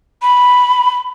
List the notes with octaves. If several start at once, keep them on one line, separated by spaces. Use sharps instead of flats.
B5